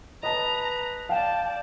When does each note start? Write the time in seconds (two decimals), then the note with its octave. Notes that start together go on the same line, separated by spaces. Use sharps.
0.23 B4 D#5 A5 A#5
1.09 D5 F5 G5 A5